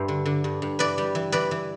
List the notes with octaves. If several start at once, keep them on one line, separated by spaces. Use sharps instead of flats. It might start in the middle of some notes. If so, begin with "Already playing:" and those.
Already playing: G2 G3 C5 E5
D3
D3
G2
G2
E3 B4 D5
G3
E3
E3 B4 D5
E3